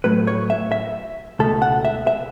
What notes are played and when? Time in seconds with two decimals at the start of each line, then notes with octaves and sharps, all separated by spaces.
0.04 A2 F#3 A3 B4
0.27 C#5
0.50 E5
0.72 E5
1.39 C#2 B2 A3 A4
1.62 F#5
1.85 E5
2.07 E5